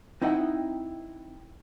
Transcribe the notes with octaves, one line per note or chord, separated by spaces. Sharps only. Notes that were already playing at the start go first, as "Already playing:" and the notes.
C4 D#4 E4 D#5 F#5 G5